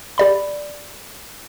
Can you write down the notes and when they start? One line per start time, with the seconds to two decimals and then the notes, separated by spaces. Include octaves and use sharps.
0.18 G4 D5 B5